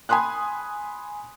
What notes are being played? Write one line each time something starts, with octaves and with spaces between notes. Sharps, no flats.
G#5 B5 C6 D#6 F#6